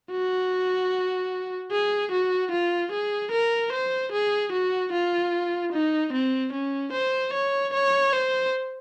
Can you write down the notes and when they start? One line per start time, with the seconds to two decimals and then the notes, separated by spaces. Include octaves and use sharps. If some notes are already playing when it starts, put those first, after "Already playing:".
0.11 F#4
1.72 G#4
2.12 F#4
2.52 F4
2.92 G#4
3.32 A#4
3.72 C5
4.12 G#4
4.52 F#4
4.93 F4
5.73 D#4
6.13 C4
6.53 C#4
6.93 C5
7.33 C#5
7.74 C#5
8.13 C5